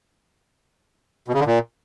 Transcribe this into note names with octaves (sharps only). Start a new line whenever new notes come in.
B2
C#3
D3
A#2